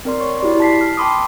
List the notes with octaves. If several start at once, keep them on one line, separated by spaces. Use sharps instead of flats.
C4 A#4 D5 C6
C#5 C#6
E4 F#4 G4 D5 C6
A5 B6 C7
F6
G5 A5 B5 C6 D6 D#6